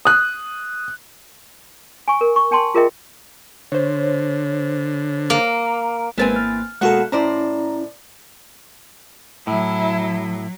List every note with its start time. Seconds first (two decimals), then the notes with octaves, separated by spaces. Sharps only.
0.05 D#6 F#6
2.08 G#5 C#6
2.21 A#4
2.36 C#6
2.51 D4 G5 A5 C6
2.74 F4 G#4 A#4 D#5 E5 G5
3.72 D3 C5 C#5
5.30 A#3
6.18 G#1 E3 G#3 A#3 C4 B4 G#5 A6
6.36 F6
6.81 B2 G#3 A#3 F#4 A4 F#5 F#6
7.12 A2 C#4 E4 C5 D5 A#5
9.47 A2 F#3 E4